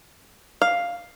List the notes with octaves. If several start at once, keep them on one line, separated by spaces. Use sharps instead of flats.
F5